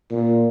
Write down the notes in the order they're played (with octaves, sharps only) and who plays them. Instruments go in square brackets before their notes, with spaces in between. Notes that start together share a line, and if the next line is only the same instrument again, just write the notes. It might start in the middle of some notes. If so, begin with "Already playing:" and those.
[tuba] A#2